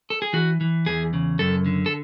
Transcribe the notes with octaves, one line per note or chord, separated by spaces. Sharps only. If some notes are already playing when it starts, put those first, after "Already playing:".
A4
G#4
E3 F#4
E3
E2 G#4
C#3
F#2 A4
D3
A4